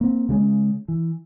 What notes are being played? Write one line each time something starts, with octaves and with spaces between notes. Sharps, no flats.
A#3 C4
C#3 G3 G#3 C#4
E3